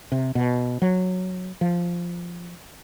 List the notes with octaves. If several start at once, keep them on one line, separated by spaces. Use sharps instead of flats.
C3
B2
F#3
F3